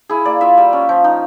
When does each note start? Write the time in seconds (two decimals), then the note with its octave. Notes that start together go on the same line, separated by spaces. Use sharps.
0.09 E4 G#4
0.25 A#3 D5
0.41 F4 E5
0.58 G3
0.73 C#4
0.89 F3
1.04 D#4